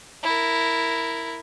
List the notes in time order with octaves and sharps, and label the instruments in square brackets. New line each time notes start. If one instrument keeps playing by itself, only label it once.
[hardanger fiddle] E4 A#4